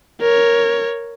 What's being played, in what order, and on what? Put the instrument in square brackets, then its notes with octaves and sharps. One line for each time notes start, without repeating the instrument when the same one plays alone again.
[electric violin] A#4 C#5